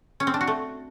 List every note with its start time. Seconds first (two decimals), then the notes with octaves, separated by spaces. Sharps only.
0.20 C#4
0.27 C4
0.34 D4
0.41 F#4
0.47 A3